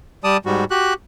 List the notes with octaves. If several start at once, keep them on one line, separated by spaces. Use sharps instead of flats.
G3 D5 A5 D#6
G#2 G3 F#4
F#4 G4 F#6